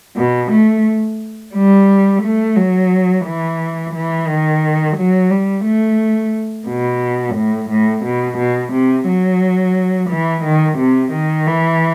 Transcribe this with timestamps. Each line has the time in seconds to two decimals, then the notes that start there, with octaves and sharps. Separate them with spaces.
0.17 B2
0.52 A3
1.55 G3
2.23 A3
2.57 F#3
3.26 E3
3.95 E3
4.28 D#3
4.97 F#3
5.31 G3
5.65 A3
6.68 B2
7.36 A2
7.70 A2
8.05 B2
8.39 B2
8.73 C3
9.08 F#3
10.10 E3
10.44 D#3
10.79 C3
11.13 D#3
11.47 E3